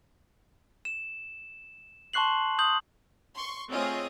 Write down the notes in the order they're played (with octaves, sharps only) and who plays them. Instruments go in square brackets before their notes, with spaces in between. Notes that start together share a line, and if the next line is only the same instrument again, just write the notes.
[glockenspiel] E7
A5 C6 C#6 F#6 C7 F#7
D#6 G6 F#7
[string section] C6 C#6
A3 C4 F4 G#4 C#5 D#5